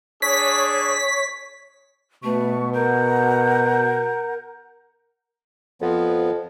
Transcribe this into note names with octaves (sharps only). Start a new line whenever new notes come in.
D4 G#4 C#5 B6
B2 A3 B4 A5 C#6
A#4 F#5 A#5 G6
F2 F3 B3